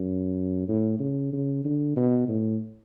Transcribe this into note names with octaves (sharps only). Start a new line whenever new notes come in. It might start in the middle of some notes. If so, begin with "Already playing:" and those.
Already playing: F#2
A2
C#3
C#3
D3
B2
A2